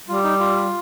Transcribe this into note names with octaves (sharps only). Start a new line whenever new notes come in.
G3 F4
D#4
F4